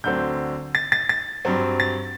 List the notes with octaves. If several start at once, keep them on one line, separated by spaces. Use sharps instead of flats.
D2 D3 F#3 C4 G6
A6
A6
A6
G2 F#3 C4
A6